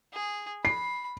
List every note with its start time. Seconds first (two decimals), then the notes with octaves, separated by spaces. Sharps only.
0.14 G#4
0.65 B5 C7